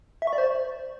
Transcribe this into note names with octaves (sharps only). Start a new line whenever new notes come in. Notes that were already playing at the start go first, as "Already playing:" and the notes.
E5
C#6
D5
C5